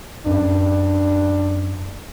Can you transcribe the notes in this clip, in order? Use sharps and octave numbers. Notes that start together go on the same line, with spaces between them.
F#2 D4